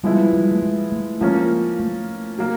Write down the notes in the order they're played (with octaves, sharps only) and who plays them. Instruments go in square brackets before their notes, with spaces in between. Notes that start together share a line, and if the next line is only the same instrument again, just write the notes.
[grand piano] F3 G#3 B3 E4 [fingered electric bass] G3
[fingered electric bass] G3
A3
G#3
A3
[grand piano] F3 A#3 C#4 [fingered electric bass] G#3
[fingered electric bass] A3
[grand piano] F#3 A#3